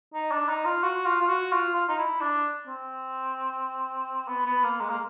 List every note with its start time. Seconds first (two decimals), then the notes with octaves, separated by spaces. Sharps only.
0.14 D#4
0.31 D4
0.49 D#4
0.65 F4
0.83 F#4
1.06 F4
1.21 F4
1.29 F#4
1.52 F4
1.75 F4
1.89 D#4
1.98 E4
2.21 D4
2.67 C4
4.28 B3
4.46 B3
4.63 A#3
4.81 G#3
4.90 A#3